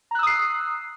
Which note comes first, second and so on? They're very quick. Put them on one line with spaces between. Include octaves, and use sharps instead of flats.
A#5 F#6 E6 D#6 C7